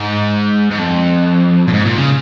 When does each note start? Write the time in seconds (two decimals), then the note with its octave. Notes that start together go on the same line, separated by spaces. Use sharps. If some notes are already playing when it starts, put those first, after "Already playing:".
Already playing: G#2
0.71 G#2
0.78 F2
1.68 A#2
1.73 G#2
1.85 A#2
1.97 C#3